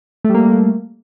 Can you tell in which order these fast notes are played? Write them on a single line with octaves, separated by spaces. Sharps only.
A3 G3 A#3